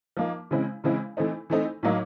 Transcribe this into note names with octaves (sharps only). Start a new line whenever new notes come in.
F3 A#3 D#4
C#3 E3 G#3 C4 E4
C#3 E3 G#3 C4 E4
E3 A3 C4 D#4
E3 A3 C4 D#4
A2 F#3 A#3 D#4